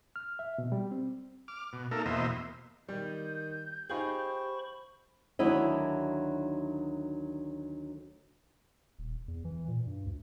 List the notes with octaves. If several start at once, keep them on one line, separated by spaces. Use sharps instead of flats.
F6
E5
B2
G3
C4
D6 F6
B2
A3 A#3 D#4 A4 A#4
E2 B2 A#3 C5 D#5 E5
D#3 G3 G6
D#4 F4 G4 G#4 C5 B5 C#6
D2 D#3 F#3 D4 E4 D#5
D#1
E2
E3
A#2
G2
D2